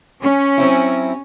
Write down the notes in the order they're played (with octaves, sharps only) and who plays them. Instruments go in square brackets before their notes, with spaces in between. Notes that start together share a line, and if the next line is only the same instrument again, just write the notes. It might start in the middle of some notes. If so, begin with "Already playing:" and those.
[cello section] C#4
[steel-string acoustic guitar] F#3 C4 E4